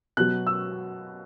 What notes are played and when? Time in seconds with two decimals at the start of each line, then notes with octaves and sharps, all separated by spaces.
0.17 B2 F#3 F#6
0.47 E6